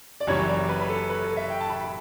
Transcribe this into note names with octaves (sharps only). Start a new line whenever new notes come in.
D5
F#1 F#2 E3 G3 C#4 C#5
D5
B4
B4
A4
B4
A4
E5
G5
A5
B5
B5